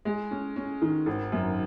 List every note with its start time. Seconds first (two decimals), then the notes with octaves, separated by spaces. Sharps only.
0.05 G#3
0.31 C#4
0.56 C#4
0.82 D#3
1.06 G#1
1.32 F#2